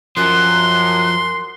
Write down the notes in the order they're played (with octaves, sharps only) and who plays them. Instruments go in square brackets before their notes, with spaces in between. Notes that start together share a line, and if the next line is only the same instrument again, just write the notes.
[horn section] F#2 [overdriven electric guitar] F3 [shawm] C6 [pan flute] F#6